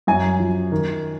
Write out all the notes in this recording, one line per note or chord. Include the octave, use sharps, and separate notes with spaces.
F#2 G#5
F3
D#3